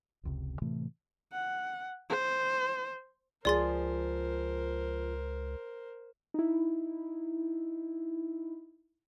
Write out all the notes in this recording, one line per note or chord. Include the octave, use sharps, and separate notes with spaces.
F1 C#2 C3
A2 C3 E3 A3
F#5
C5
C#2 F3 G#4 A#4 C5 D5 C6 A6
D#4 E4